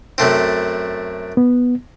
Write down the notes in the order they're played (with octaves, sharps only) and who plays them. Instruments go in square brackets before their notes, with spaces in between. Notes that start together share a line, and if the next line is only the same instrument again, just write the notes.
[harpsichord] F#2 A3 C4
[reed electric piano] B3